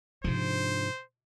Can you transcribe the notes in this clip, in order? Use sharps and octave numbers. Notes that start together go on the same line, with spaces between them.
G#2 C3 F3 D4 C5